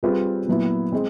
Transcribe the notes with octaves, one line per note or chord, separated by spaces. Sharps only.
G3 C4 F4 G#4 B4
A#2 F#3 B3 E4
G#3 C4